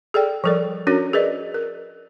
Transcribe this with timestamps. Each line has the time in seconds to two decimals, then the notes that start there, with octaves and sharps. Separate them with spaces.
0.14 G#4 A4 D5 G5
0.44 F3 G3 A4 A#4 D5
0.87 C#4 D4 F#4 A#4 C#5
1.13 G#4 A#4 B4 D5 D#5
1.54 A#4